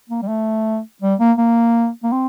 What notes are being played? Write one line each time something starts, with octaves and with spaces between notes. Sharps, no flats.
A#3
G3
A3
G3
A#3
A#3
A#3
C4